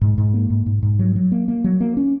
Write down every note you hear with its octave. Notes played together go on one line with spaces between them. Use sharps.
G#2
G#2
A#3
G#2
G#2
G#2
F#3
F#3
A#3
A#3
F#3
A#3
C#4